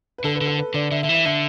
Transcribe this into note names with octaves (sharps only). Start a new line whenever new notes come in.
B4
D3 A4
B4
D3
A4
B4
D3 D5
D3 E5
D3 E5
E3
E5
D3 E5